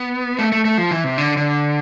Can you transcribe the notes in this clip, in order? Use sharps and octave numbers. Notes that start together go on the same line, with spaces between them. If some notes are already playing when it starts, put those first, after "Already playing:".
Already playing: B3
A3
A3
A3
F3
E3
C3
D3
D3